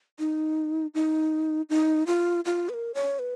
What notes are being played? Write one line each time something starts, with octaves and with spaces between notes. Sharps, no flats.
D#4
D#4
D#4
F4
F4
B4
A#4
C#5
B4